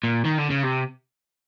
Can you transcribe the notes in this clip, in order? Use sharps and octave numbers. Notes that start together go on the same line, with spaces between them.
A#2
D#3
D3
C#3
C3